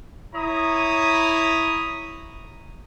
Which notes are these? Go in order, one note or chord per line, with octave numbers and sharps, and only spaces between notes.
E4 C#5 A#5 D#6